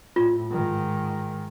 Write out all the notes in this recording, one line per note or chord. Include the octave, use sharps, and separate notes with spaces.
A2 F4
G#2 D#3